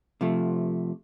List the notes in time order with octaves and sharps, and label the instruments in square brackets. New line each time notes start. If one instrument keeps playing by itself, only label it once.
[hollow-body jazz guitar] C3 F3 A3